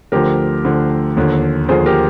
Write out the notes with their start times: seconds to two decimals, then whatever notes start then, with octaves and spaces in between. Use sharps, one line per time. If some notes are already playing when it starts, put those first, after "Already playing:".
0.12 D2 D3 F3 G4 A#4
0.65 D2 D3 F3
1.17 D#2 D3 F3
1.69 D#2 D3 F3 G#4 C5
1.86 G4 A#4